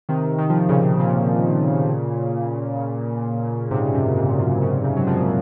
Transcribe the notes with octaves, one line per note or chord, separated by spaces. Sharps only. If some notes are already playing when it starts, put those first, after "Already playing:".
C3 D#3
C3 D#3
F3
D#3
A#2 C#3
A#2 C#3
G#2 C3
F#2 A#2
G#2
C3
F#2 A#2
A#2 C#3
G#2 C3
F#3
C#3 F3